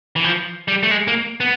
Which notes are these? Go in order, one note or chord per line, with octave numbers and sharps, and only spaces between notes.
E3
F3
G3
A3
G#3
A#3
B3